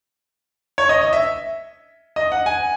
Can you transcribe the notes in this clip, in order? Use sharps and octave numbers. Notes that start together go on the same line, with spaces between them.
C#5
D#5
D#5
E5
D#5
F#5
G#5